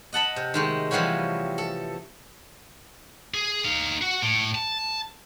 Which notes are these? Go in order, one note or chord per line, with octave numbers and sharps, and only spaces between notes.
D#5 F#5 A5 B5
C3
D#3 G#3 A3
C3 E3 F3 G3 B3 C#4
A4
G#4
D#4 F5
F#4
A2
A5